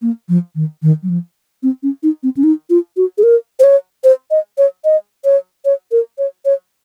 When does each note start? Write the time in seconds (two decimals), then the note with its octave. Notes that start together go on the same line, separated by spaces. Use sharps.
0.02 A#3
0.29 F3
0.55 D#3
0.82 D#3
1.03 F#3
1.09 F3
1.63 C4
1.83 C#4
2.03 D#4
2.23 C4
2.37 C#4
2.44 D#4
2.70 F4
2.97 F#4
3.18 G#4
3.23 A#4
3.60 C5
3.64 C#5
4.04 C5
4.31 D#5
4.58 C#5
4.85 D#5
5.25 C#5
5.65 C#5
5.92 A#4
6.18 C#5
6.45 C#5